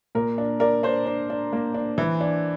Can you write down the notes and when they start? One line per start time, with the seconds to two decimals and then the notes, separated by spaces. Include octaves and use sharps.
0.15 A#2 A#4
0.38 D4
0.60 D4 A#4 D5
0.83 D4 C5
1.06 D4
1.30 D4
1.53 A#3
1.74 D4
1.98 E3
2.21 D4